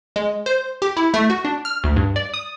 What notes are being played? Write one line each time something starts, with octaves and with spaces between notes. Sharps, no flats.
G#3
C5
G4
E4
A3
F#4
D4
F6
D2
G2
D5
D#6